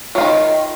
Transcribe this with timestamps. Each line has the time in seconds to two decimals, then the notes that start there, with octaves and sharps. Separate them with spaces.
0.15 F#3
0.18 F4
0.21 D#3